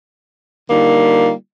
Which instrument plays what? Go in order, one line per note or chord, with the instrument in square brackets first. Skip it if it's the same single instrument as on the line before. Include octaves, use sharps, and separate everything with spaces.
[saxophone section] D3 G3 A#3 D#4 F4